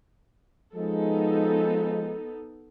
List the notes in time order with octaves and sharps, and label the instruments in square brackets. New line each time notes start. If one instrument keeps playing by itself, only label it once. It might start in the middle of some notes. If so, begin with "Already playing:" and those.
[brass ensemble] F3 G#3 [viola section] B3 D#4 A4